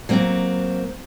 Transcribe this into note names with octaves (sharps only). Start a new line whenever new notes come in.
F#3 A#3 C4